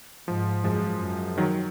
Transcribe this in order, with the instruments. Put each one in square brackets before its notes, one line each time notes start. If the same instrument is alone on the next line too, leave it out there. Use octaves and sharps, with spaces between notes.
[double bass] G#2 [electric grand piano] F3
[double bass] F#2 [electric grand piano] F3 G#3
[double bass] F#2
[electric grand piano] D#3 F#3